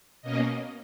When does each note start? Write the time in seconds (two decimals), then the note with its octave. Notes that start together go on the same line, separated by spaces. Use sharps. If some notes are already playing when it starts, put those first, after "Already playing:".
0.22 B2 A#3 C#4 D#5